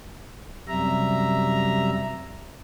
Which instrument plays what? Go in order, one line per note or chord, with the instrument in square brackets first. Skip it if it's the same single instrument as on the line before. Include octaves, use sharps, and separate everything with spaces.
[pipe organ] F#2 C3 G3 E5 A#5